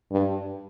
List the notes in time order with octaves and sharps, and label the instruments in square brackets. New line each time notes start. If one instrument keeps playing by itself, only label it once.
[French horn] G2